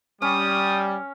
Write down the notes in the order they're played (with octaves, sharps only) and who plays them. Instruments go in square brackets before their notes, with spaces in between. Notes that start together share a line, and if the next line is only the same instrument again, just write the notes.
[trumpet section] G3 [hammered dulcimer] C#4 [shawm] D#6